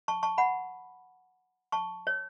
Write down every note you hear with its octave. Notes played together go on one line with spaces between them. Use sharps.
A5 C#6
A5 C#6
F#5 B5
A5 C#6
C#5